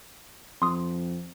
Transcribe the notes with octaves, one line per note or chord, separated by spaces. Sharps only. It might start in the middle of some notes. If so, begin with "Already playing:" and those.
F2 C6 D#6